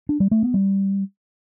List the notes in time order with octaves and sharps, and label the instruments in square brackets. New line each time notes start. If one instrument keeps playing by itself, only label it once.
[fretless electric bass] D4
G3
A3
B3
G3